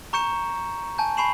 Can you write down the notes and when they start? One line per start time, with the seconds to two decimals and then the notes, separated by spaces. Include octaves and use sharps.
0.13 A#5 C#6 G6 C#7 E7
0.98 G#5 A5 G6
1.17 G#5 B5 C#6 C7 E7 F#7